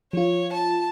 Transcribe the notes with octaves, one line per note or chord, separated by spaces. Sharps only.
F3 F4 C#5
A5